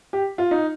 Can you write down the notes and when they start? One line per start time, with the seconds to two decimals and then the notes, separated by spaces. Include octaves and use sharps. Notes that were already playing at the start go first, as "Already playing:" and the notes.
0.13 G4
0.38 F4
0.51 D#4